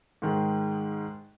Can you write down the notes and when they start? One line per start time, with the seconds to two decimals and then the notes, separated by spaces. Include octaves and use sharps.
0.22 G#2 D#3 G#3